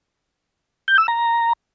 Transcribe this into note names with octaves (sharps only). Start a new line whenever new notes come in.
G6
E6
A#5